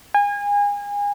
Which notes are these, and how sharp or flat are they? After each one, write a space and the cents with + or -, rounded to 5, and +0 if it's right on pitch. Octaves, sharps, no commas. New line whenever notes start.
G#5 -30